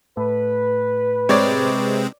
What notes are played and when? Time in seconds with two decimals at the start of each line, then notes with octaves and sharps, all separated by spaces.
0.17 A2 B4
1.29 C3 G#3 C4 C#5 D5